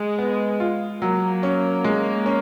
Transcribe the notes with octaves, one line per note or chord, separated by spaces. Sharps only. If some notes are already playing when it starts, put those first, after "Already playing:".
Already playing: G#3
B3
F4
F#3 A#3
C#4
G#3
C#4